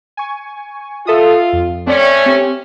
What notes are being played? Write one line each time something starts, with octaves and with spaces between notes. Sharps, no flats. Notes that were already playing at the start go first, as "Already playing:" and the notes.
G#5 C#6
F4 A4 E5 D#6
F2
A3 C4 C#4 D5
C4 G4